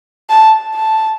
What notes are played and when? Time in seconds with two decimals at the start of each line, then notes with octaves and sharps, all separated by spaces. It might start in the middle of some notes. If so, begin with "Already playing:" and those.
0.30 A5
0.75 A5